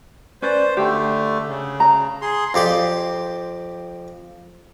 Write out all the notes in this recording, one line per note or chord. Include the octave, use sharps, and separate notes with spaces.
C#4 B4 C5 D5
D3 A3 G4
C#3
A#5
G#4 C6
F2 G4 D5 C6